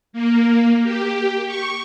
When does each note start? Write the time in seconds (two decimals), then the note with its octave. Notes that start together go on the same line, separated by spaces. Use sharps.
0.13 A#3
0.83 G4
1.47 C#6